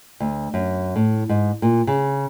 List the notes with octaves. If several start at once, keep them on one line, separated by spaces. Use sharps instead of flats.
D2
F#2
A2
G#2
A#2
C#3